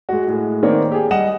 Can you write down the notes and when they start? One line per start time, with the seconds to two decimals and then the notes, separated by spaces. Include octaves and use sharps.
0.09 G#3 F#4
0.27 A2 G#3
0.63 D#3 A#3 C4 C#5 D5
0.92 G4 G#4
1.11 G3 D#5 F#5 E7